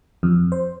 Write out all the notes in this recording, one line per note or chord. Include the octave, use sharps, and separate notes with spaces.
F2
C5